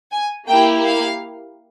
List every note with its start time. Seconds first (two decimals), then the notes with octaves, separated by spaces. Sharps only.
0.12 G#5
0.48 A#3 E4 G4 G5
0.85 F5